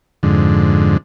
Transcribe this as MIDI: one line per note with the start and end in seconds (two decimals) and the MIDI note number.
0.23 0.97 41
0.23 0.97 44
0.23 0.97 50